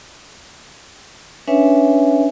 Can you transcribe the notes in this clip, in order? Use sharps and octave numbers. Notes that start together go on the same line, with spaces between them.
C#4 D4 B4 C#5 E5 G#5